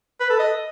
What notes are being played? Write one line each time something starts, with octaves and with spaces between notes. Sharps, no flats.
B4
A4
D#5